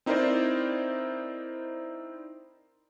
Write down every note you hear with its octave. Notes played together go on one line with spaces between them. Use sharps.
C4 D#4 E4 A#4 C5 D5